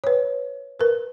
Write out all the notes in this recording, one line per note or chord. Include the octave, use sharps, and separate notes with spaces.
B4 C#5
A#4 B4